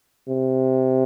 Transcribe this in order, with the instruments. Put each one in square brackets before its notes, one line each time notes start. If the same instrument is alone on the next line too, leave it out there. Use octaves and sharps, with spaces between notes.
[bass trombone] C3